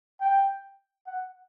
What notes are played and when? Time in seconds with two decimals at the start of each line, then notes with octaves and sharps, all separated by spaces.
0.21 G5
1.07 F#5